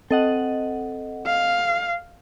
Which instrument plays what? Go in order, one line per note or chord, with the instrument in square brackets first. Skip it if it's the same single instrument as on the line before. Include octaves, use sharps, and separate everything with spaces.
[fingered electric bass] C4 [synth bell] A4 D#5 F#5
[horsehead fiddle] F5